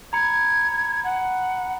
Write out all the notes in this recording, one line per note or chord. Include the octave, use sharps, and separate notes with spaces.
A#5 B5 G#6 C#7
F#5